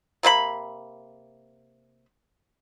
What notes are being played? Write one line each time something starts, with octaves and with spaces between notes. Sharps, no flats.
C3 A#3 D#4 B5